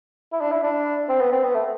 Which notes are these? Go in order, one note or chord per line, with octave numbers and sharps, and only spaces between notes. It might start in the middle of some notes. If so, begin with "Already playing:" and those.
E4
D4
E4
D4
C4
B3
C4
B3
A3